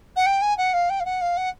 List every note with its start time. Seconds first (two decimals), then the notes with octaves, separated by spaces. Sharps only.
0.16 F#5
0.26 G5
0.41 G#5
0.57 F#5
0.73 F5
0.89 G5
1.00 F5
1.05 F#5
1.21 F5
1.37 F#5